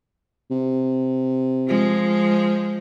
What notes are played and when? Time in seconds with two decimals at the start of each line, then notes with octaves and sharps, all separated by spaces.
0.51 C3
1.68 F3 G#3